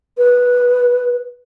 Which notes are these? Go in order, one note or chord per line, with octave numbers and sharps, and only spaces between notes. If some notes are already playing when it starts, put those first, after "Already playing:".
B4